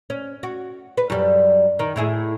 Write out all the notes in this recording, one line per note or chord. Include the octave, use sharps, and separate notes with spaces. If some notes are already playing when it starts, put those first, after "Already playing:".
C#4
F#4
B4
F#2 G3
D#3
A2 E4 G#4